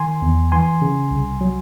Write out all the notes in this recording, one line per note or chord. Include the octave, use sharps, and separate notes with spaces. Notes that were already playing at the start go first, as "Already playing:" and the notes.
Already playing: D#3 G#5 C6
E2
E3 G#5 C6
C#3
C2
F#3